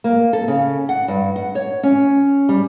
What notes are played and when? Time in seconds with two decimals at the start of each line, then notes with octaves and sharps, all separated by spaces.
0.04 A#3
0.33 A4
0.48 C#3
0.89 F#5
1.08 G2
1.36 F#5
1.55 C#5
1.83 C#4
2.49 G3